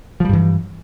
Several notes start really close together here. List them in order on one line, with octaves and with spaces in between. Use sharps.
F3 G3 G2 E3